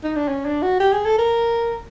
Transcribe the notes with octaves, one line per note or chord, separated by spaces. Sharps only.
D#4
D4
C#4
D4
F#4
G4
G#4
A4
A#4